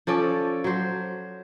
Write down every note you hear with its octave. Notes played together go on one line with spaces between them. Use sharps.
F3 C#4 A4 D5
F#3 C5